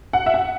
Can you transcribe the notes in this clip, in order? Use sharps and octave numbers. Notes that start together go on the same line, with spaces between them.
F#5
E5
F#5